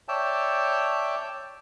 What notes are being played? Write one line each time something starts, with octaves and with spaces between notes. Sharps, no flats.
C#5 D5 E5 G5 A5